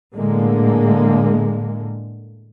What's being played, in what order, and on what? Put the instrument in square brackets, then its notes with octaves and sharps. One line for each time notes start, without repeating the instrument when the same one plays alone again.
[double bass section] A2 D3 G#3 A#3